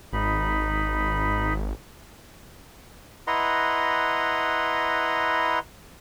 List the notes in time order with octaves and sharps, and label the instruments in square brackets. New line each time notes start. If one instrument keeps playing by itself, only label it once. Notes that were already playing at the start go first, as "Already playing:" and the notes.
[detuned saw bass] G#1 [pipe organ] D#4 B5
[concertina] E4 B4 D#5 F#5 A#5 C6